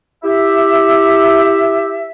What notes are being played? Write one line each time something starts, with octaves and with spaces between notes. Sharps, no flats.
E4 G4 E5